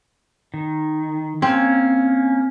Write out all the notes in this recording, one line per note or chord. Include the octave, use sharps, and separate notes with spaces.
D#3
A#3 C4 C#4